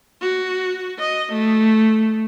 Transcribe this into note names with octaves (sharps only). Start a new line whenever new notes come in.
F#4
D#5
A3